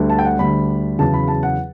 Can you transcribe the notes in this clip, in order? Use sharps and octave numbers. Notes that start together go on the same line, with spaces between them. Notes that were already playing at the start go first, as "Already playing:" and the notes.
Already playing: D2 D3 G3
A5
G5
F#5
D2 D3 G3 B5
E2 C#3 F#3 A5
B5
A5
F#5